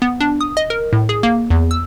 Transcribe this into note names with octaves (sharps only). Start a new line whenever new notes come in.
B3
D4
D#6
D#5
A#4
A2
G#4
A#3
E2
E6